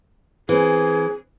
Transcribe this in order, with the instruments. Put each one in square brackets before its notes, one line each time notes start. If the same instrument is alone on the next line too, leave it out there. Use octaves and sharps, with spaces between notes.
[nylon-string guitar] E3 C4 [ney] G#4